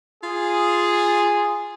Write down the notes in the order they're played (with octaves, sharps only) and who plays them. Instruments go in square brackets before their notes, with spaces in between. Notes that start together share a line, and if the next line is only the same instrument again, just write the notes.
[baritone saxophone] F4 [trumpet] G#4